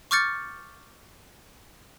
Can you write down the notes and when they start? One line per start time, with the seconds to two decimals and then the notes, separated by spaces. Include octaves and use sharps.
0.11 C#6 D6 F6 G6 A6 C#7